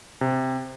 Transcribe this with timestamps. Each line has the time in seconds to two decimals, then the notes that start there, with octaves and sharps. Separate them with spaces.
0.21 C3